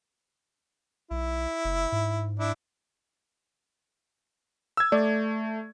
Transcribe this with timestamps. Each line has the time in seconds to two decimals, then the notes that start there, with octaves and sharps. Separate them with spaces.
1.11 B1 E4
1.65 F#1
1.92 G#2
2.39 D4 E4
4.77 E6 G#6
4.92 A3 D5